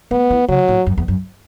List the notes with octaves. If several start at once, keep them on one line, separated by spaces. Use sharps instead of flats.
A3 B3
E3
C#3 F#3
A2
F#2
E2
F#2